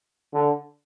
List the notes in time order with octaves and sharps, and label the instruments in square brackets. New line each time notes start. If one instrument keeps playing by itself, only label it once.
[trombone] D3